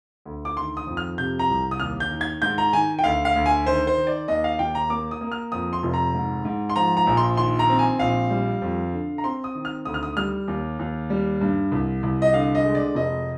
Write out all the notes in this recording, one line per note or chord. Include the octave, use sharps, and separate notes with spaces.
D2
D6
D#3 C6
D#6
F2
F6
C3 G6
A#5
C2
D#6
D#2 F6
G6
D#3
G#6
G#2 G6
A#5
D#3 G#5
G5
D2 F5
F5
D2
G#5
D#3 C5
C5
D#3
D5
D#2 D#5
F5
D#2 G5
A#5
A#3 D6
D#6
A#3
F6
F2 D#6
C6
F1
A#5
G#2
G#2
C6
F3 A#5
A#5
A#1
C6
D#3 C6
A#5
C4
G#5
A#1 F5
G3
F2
D3
A#5
C4 C6
D#6
D#3
F6
D2 D#6
F6
D#6
G3 F6
D#2
D#2
G3
G2
C2
C2
D#5
D3 F5
D#5
G#3
D5
F1 D#5